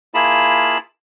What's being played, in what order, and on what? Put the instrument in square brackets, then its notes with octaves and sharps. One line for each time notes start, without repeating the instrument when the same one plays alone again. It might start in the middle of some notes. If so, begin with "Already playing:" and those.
[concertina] A#3 E4 F4 G#4 A5 B5